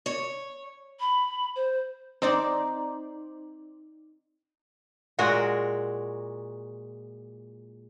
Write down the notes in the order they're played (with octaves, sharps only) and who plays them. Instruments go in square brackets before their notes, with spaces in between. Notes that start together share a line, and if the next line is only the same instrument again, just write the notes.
[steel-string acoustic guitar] C#5
[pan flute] B5
C5
[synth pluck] C4 C5 D5 [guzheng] D#4
[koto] A#2 G#3 F#4 A#4